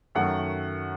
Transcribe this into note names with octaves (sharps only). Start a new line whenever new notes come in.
F#2 D#3 F#3 A3 F#5